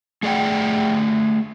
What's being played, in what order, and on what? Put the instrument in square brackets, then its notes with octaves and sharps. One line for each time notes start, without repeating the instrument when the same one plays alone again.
[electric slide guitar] A3 G#4 D5 F#5 G5